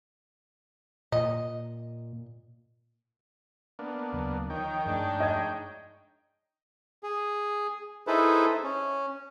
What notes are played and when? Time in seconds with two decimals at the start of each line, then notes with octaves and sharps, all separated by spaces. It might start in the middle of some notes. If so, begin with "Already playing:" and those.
1.12 A#2 D#5
3.79 A#3 B3 D4
4.13 D2 C#3 F#3
4.50 D#3 F3 D#4 C#5 G5
4.86 G2 F3 G#3 A3 D4
5.20 D#5 G#6
7.03 G#4
8.07 D#4 E4 G#4 A4 B4 C5
8.63 C#4